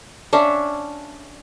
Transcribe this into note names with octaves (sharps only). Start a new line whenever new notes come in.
C#4 D4 E5 F5